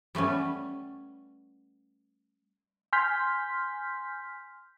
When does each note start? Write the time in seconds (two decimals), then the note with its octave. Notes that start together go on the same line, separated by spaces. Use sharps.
0.15 G3 A3 B3 C#4
2.93 G#5 C6 F6 G6 B6